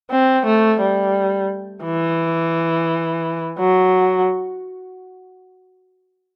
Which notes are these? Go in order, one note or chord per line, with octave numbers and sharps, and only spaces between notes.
C4
A3
G3
E3
F#3